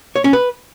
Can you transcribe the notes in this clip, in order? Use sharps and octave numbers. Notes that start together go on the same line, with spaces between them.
C#5
C#4
B4